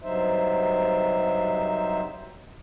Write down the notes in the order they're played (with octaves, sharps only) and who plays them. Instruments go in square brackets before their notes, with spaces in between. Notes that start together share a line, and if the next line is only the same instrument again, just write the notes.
[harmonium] G2 C3 F#3 D#4 C5 E5